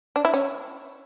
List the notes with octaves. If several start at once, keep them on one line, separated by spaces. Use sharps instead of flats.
D4
E4
C#4